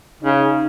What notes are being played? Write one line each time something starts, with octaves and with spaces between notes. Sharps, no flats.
C#3 D#4